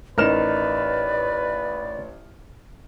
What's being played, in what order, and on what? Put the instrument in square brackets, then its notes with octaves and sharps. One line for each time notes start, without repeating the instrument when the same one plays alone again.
[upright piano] A1 F6 E7 [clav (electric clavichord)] D#4 A#4 [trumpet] B4 [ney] D5